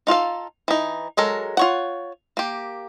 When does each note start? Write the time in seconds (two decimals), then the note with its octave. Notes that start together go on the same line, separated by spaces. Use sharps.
0.07 D#4 F4 A4 F5
0.68 E3 D#4
1.17 F#3 G#3 A4 A#4
1.57 F4 C#5 F#5
2.37 A#3 G4